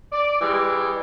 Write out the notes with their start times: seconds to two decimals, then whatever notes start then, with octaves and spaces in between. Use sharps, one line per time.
0.12 D5
0.41 E3 G3 G#3